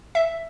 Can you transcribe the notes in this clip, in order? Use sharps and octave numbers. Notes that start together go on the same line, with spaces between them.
E5